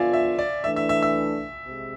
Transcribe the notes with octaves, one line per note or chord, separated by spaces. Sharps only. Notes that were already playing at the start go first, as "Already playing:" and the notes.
Already playing: D3 F3 B3 F4 D5 E5 F5 G#5
E5
D5
E3 A3 D4 E5
E5
E5
E5
C3 G#3